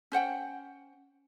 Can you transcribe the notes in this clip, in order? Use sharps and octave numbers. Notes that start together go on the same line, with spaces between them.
C#4 C5 F#5 G5